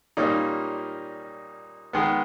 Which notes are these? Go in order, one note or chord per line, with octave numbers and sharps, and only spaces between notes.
A#2 G3 A#3 C#4 D#4
D#3 G#3 B3